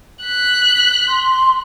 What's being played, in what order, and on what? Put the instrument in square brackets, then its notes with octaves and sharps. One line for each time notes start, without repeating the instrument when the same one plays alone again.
[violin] F#6 B6
[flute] C6